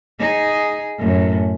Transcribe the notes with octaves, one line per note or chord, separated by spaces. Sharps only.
D#4 G#4
F#2 A2